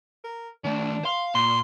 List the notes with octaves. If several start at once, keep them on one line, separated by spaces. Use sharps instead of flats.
A#4
D#3 A3 D4
F5 C6
A#2 C6